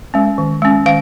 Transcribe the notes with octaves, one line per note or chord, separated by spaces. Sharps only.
G#3 C#4
D#3
G#3 C#4
D#3 F5